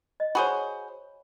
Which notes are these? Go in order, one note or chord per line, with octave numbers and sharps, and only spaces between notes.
D#5
F#4 G#4 C5 C#5 B5